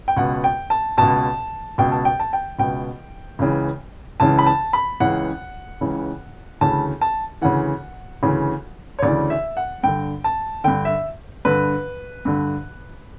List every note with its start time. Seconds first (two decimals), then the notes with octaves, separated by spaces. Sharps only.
0.08 G5
0.17 C#2 B2 F#5
0.44 G5
0.70 A5
0.97 C#2 B2 A5
1.78 C#2 B2 G5
1.92 A5
2.05 G5
2.20 A5
2.33 G5
2.59 C#2 B2 G5
3.39 C#2 C#3 E3
4.20 C#2 C#3 E3 A5
4.39 B5
4.46 A5
4.73 B5
5.00 C#2 C#3 E3 F#5
5.81 C#2 C#3 E3
6.61 D2 C#3 E3 A5
7.01 A5
7.41 D2 C#3 E3 F#5
8.23 D2 C#3 E3
8.99 C#5
9.03 D2 C#3 E3 D5
9.30 E5
9.57 F#5
9.83 G2 D3 G5
10.24 A5
10.64 G2 D3 G5
10.85 E5
11.45 G2 D3 B4
12.25 G2 D3